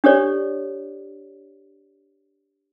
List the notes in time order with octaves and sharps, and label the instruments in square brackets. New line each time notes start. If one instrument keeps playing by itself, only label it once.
[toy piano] D4 G4 A4 C#5 D5